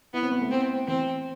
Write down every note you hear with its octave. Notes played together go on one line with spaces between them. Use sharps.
B3 E4
C4
B3
A3
C4
E3 C4